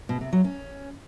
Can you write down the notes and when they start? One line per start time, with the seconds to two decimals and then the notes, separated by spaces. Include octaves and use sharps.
0.09 B2
0.21 C3
0.33 F#3
0.44 C#4